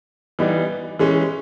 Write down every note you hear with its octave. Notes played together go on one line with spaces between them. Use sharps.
E3 G3 B3 D#4
E3 G#3 C#4